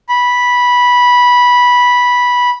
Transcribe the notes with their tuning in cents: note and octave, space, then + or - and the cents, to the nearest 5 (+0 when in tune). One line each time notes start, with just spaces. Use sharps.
B5 -10